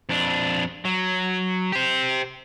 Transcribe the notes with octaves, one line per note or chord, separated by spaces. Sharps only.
F2 D4
F#3
G4 C5